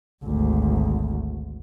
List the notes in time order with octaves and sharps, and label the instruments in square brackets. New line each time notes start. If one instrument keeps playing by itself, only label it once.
[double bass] G#1 D2